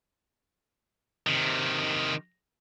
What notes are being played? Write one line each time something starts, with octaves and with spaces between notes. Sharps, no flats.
C3 D#3